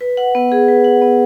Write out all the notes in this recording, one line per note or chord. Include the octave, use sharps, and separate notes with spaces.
B4
F#5
B3
G#4
B4
F#5
B3